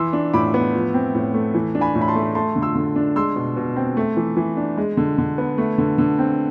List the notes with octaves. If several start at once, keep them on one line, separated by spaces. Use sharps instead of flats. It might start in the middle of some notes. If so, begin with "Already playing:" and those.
Already playing: E3 C6 E6
D4
A2 B5 D6
B3
F3
C4
A2
A3
E3
D4
G#5 B5
A2
B5
A5 C6
A3
A3 A5 C6
D3
C6 E6
D3
D4
G#3 C6 E6
B2
B2
C4
A3
E3
E3
D4
G#3
D3
D3
B3
A3
D3
D3
C4